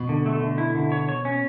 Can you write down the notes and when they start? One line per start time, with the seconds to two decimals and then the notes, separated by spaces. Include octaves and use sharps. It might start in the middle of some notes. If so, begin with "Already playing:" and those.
Already playing: B2
0.09 D3
0.26 A3
0.41 D3
0.58 E4
0.75 D3
0.92 C#5
1.09 C#5
1.25 C#4